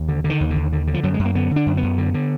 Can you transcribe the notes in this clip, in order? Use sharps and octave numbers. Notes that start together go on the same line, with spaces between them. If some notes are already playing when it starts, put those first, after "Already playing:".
Already playing: D#2
D3
D3
D#3
D#2
D3
D#2
D3
D3
F3
F#2 F#3
G#3
F#2
A#3
D3 B3
D3
D4
F#2
B3
F#2
D3
D3